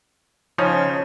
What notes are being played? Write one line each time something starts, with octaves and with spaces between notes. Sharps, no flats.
C#3 F3 C#4 D#4